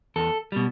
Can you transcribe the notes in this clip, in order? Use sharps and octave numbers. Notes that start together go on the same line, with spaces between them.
E2 A4
B2 G3